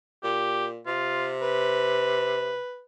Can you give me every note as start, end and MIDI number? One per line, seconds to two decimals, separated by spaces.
0.24 0.80 46
0.24 0.66 67
0.87 2.57 48
0.87 1.32 65
1.42 2.82 71